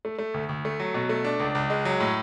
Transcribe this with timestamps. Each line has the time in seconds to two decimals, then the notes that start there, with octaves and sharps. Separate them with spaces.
0.05 A3
0.19 A3
0.34 D2
0.49 D2
0.65 A3
0.80 F#3
0.94 B2
1.09 A3
1.25 D4
1.40 C#2
1.55 C#2
1.70 G#3
1.85 F#3
2.00 A2